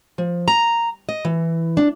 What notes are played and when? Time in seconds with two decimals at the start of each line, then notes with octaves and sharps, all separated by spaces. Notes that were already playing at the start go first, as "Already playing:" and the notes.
0.18 F3
0.48 A#5
1.09 D#5
1.25 E3
1.77 D4